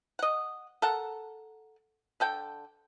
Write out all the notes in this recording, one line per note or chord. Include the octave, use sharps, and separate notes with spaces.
D#5 F#5
A4 A#4 F#5
D3 A4 G5